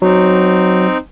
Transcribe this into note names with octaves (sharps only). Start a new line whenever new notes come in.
F#3 C4 D#4